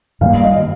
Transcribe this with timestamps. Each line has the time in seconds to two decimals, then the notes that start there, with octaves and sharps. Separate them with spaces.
0.21 G2 D#3 G3 A#3 F5
0.43 D#5